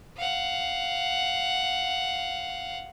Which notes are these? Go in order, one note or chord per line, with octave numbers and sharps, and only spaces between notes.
F5 F#5